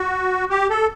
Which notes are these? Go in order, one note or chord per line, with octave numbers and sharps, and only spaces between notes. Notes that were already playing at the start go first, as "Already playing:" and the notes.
Already playing: F#4
G4
A4